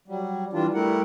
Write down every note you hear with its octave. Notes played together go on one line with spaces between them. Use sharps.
F#3 G3
E3 G3 D4 F4
G3 A3 E4 A#4 F#5